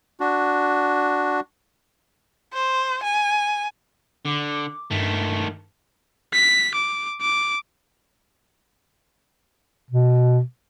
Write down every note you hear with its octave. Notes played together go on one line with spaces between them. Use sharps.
D4 F#4
C5
G#5
D3 D6
G2 D#3 A3
B6
D6
D6
B2